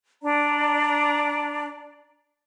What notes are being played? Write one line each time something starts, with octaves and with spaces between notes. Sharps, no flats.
D4 D5 A#5